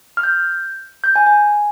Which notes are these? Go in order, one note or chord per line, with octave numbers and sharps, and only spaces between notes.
F6
G6
G6
G#5
G#5